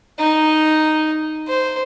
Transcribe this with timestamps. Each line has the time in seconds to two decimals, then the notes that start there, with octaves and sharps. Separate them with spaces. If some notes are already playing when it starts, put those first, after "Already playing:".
0.19 D#4
1.48 C5